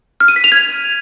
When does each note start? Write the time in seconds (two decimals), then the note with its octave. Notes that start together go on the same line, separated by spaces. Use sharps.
0.20 F6
0.28 D#7
0.36 B6
0.44 F7
0.52 G#6